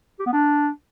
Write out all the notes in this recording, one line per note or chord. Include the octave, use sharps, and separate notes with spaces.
G4
B3
D4